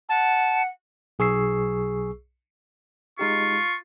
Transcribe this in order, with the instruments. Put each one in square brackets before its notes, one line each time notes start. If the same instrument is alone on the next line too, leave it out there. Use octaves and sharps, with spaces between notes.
[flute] F#5 [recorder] A5
[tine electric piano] B1 G#4 C#6 E6 C7
[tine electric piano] G#3 D#4 G4 [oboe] F4 [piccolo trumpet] C#6